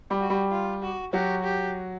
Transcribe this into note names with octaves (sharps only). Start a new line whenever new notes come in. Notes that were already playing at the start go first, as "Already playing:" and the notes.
G3 G4
F#4
G3 G4
F4
F#4
F#3 F#4 G4
G4